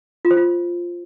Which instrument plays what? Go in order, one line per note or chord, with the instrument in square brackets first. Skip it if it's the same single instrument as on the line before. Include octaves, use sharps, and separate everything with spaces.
[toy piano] F4
C5
F4